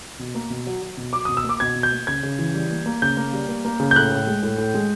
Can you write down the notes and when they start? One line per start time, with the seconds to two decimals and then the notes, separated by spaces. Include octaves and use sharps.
0.19 B2
0.35 A#3
0.50 B2
0.67 F#3
0.82 F#3
0.97 B2
1.13 F#3 D6
1.25 B2 D#6
1.37 E6
1.44 A#3
1.49 D6
1.60 B2 G#6
1.76 B2
1.83 G6
1.92 A#3
2.07 C#3 G#6
2.23 C#3
2.39 E3
2.54 G3
2.71 A#3
2.86 A#3
3.02 C#3 G6
3.17 A#3
3.33 G3
3.49 A#3
3.65 A#3
3.80 C#3
3.91 G6
3.96 A2 F#6
4.11 A2
4.27 G#3
4.43 A2
4.58 A2
4.74 G#3